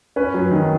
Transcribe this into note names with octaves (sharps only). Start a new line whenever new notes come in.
C#4 B4
F#3
D#3